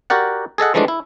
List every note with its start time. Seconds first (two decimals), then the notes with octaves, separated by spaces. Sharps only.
0.10 F#4 G4 A#4 D5 F#5
0.58 G#4 A4 D#5 F#5
0.74 E3 F3 G#3 A3 D4
0.88 E4